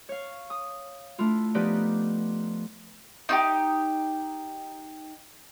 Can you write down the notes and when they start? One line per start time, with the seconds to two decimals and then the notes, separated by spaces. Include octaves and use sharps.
0.09 C#5 F5
0.50 D#6
1.19 A3 D4 E4 F4
1.55 F3 B3 D#4 G4 B4 D5
3.29 D#4 F4 G4